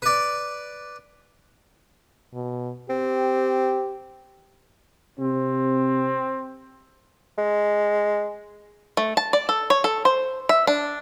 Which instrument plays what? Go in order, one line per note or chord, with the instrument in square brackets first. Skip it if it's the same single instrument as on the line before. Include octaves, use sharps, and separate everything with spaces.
[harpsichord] B4 D5
[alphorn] B2
[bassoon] C4 [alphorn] G4
[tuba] C3 [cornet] C4
[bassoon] G#3
[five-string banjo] A3
A5
D5
A4
C#5
A4
C5
E5
D4